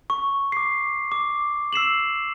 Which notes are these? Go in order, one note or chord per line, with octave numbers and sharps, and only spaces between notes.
C#6
D6 C7
D6
E6 C7 E7 F#7